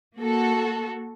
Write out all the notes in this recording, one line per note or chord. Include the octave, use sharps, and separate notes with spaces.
A#3 F#4 A4